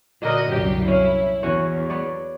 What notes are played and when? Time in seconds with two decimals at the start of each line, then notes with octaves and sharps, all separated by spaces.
0.22 A#2 D3 F#4 A#4 D#5
0.52 C2 F#2 G4 G5
0.88 C#4 E4 F5
1.43 E2 C#4 F#4 C#5
1.90 B3 C#5 D5